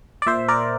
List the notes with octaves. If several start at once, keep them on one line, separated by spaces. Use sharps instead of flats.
D5
A#2 C5 E5
A#4 D5